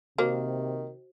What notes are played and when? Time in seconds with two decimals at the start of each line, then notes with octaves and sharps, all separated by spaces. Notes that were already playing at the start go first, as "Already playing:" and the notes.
0.18 C3 D#3 A#3 F#4 C5